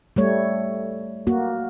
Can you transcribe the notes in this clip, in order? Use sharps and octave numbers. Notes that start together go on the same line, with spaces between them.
G3 A3 C#5
A#3 F#4